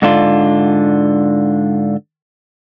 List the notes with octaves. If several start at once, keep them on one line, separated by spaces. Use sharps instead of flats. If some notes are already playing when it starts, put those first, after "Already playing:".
G#2 D3 D4 F4